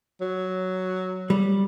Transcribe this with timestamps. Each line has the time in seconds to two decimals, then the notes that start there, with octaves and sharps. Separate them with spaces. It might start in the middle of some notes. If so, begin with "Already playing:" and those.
0.21 F#3
1.30 G3